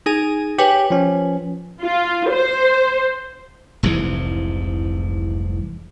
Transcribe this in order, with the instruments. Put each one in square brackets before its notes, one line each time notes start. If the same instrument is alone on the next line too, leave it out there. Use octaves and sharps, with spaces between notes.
[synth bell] D#4 G#4 G#5
[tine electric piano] G4 [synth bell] B4 C#5 G#5
[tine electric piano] F3 C#4
[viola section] F4
C5
[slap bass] F1 C2 G#2 E3